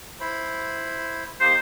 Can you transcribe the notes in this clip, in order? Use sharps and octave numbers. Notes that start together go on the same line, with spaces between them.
E4 C5 B5
A#3 D#4 G4 C5